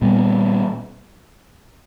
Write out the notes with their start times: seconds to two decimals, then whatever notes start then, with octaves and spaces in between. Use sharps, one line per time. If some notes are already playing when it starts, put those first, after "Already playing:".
0.02 A#2 G3 B3